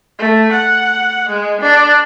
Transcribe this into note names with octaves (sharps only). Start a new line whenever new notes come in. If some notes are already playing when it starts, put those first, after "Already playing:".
A3
F#5
G#3
D4